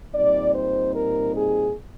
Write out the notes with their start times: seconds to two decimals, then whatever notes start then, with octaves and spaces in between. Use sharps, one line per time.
0.13 A#2 G3 C4 D#4 D5
0.54 C5
0.94 A#4
1.35 G#4